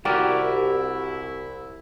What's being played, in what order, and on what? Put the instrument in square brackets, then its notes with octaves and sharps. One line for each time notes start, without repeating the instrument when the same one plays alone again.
[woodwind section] C2 E4 [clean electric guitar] F#4 A#4 D5 [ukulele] G4